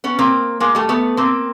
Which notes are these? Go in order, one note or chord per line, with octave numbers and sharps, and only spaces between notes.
B3 C#4
A#3 C4
G#3 A#3
G3 A3
A3 B3
A#3 C4